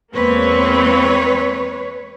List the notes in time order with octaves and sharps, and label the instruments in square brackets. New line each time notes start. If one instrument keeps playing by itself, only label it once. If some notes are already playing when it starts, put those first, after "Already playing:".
[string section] E2 A#3 C4 [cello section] G#3 B4 C#5